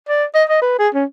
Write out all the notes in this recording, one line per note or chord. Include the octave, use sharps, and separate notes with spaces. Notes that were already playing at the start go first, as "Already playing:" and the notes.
D5
D#5
D#5
B4
G#4
C#4